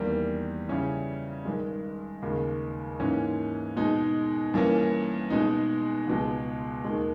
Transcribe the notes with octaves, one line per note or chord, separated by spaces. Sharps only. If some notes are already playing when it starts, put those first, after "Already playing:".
Already playing: E2 D#3 G3 A#3
C#3 G3 C#4 E4
G2 D#3 G#3
D#2 C#3 G#3
G#2 E3 A#3 C#4
B2 G#3 D#4
G2 E3 A#3 C#4
B2 G#3 D#4
C#2 B2 G#3
D#2 D#3 G#3